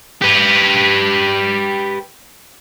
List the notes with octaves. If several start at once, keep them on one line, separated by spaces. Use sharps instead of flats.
G4 B4